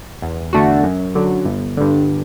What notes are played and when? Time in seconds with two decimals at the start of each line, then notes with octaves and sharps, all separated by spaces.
0.22 E2
0.53 D3 A3 D4 F#4
0.83 F#2
1.15 D3 F#3
1.45 G1
1.77 G2 D3